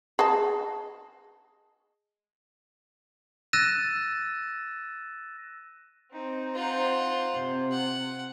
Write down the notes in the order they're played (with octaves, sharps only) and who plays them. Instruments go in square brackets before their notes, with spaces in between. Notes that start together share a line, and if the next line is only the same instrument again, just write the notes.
[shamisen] G#4 D#5 A5
[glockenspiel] E6 F#6 A6 A#6 D#7 E7
[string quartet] C4 D#4
[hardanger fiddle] F4 F#5 [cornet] C5
[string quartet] C3
[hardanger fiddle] F#5